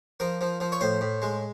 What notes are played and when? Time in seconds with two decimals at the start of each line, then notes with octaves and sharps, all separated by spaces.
0.20 F3 A#4
0.41 F3
0.60 F3
0.72 C#5
0.81 A2 C5
1.01 A2
1.22 G#3